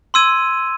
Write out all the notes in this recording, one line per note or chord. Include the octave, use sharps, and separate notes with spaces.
C6 E6 G#6 D#7